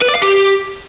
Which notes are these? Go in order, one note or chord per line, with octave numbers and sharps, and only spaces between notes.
B4
D5
F5
G4